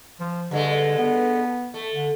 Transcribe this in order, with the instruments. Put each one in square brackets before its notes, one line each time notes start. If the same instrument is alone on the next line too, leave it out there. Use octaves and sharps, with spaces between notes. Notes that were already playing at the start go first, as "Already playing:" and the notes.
[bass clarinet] F3
[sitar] G2 G#3 A3 [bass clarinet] D3
[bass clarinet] B3
[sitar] A3
[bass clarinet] D3